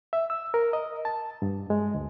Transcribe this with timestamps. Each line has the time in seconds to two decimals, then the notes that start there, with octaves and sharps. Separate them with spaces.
0.13 E5
0.30 E6
0.54 A#4
0.73 D#5
1.05 A5
1.42 G2
1.70 G#3
1.95 D2